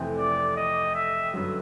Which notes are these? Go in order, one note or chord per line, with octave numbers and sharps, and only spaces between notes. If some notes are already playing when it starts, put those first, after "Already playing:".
Already playing: F2 C3 E3 A3 C4
D5
D#5
E5
G2 D3 F#3